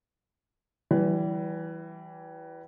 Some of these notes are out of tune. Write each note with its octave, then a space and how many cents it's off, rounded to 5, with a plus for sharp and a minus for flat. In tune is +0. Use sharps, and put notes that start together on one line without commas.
E3 +0 G3 -35